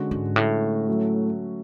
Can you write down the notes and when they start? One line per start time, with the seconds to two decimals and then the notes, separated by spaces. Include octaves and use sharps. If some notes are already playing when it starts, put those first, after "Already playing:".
Already playing: D3 G#3 C#4 F#4
0.11 G#2
0.36 A2
0.88 F#3 A3 C#4 F#4